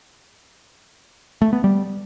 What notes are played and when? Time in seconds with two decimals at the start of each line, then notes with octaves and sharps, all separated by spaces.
1.41 A3
1.53 B3
1.64 G3